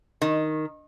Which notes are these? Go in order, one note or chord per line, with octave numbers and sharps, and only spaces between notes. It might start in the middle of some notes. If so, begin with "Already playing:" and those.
D#3